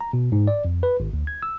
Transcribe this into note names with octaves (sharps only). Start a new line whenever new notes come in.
A#5
B2
G#2
D5
F2
B4
G#1
D2
G#6
E6